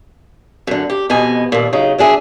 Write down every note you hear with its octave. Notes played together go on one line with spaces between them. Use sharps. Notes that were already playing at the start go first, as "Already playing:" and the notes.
F#2 D3
G4
F2 B2 B3 D#5 G#5
D#2 A#2
C#3 F#3 D#4
F#3 D4 G#4 E5